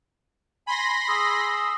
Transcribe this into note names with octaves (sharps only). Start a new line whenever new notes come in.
G#5 B5 C6 A#6
G#4 E6